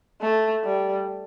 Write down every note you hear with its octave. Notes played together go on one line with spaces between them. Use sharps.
A3
G3